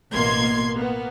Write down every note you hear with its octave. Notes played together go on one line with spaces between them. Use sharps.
A1 B2 A#3 C6 G#6 C7
A#3 B3